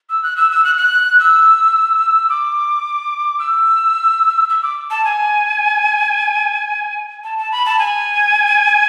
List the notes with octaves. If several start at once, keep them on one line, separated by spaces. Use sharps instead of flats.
E6
F#6
E6
E6
F#6
F#6
E6
D6
E6
E6
D6
A5
G#5
A5
A5
B5
A5
G#5